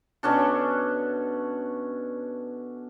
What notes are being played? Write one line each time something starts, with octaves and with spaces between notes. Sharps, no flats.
B2 C#4 D4 A4